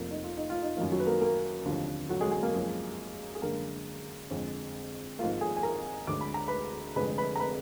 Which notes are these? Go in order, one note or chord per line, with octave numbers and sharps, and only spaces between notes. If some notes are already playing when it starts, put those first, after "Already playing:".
Already playing: F1 F2 F3 A#3
D#4
F4
D#4
F4
D#4
F#2 D#3 F3 A#3 F4
F#3 F#4
B4
A#3 A#4
A#3 A#4
F1 D#2 D3 F3
F#3 F#4
G#3 G#4
G#3 G#4
A#3 A#4
F#2 F3 G#3
G#4
F#2 D3 G#3 A#3 A#4
F2 D3 F3 G#3
G#1 G#2 F3 A#3 F4 F5
G#4 G#5
G#5
A#4 A#5
D2 D3 G#3 D6
B5
A#5
B4 B5
F1 F2 D3 G#3 B4 B5
B4 B5
A#5
B4 B5